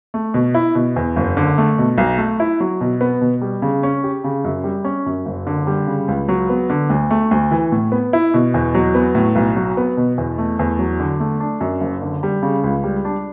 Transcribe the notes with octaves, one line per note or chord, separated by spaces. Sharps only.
A3
B2
E4
B2
E2
F#1
D3
A3
B2
B1
A3
E4
F#3
B2
B3
B2
G3
C#3
C#4
G4
C#3
F#2
G3
C#4
F#2
F#1
D3
G3
C#3
C#2
F#3
B3
D3
D2
A3
D2
E3
A2
B3
E4
B2
E2
F#3
B3
A2
B1
F#3
B3
B2
E2
A3
E2
F#3
D3
A3
D4
F#2
F#1
D3
G3
C#3
C#2
G3
D4